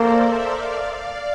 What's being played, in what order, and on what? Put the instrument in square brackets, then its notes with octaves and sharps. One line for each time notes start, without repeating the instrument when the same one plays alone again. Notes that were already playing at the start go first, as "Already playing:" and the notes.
Already playing: [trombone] A#3 [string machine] A4 A#4 C5 D5
[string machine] C5 E5
D5 F5